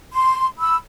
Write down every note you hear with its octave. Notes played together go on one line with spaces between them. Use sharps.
C6
B5 E6